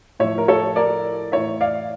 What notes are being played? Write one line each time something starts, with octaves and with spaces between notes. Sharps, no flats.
A2 F3 C#5 E5
A#4
A4 C#5
A#4 D5
A2 E3 C#5 E5
D5 F5